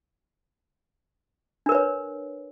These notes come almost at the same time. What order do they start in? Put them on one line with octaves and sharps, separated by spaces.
D4 A#4 B4 C#5